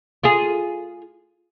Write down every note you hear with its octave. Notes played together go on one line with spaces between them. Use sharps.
F4 G#4